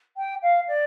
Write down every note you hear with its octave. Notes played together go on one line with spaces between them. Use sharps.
G5
F5
D5